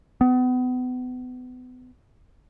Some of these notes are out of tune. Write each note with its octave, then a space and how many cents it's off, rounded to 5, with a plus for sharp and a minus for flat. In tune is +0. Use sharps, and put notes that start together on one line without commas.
B3 +30